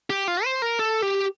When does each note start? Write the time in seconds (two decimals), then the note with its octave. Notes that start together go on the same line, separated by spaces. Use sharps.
0.10 G4
0.28 F4
0.44 C5
0.62 A#4
0.79 A4
1.02 G4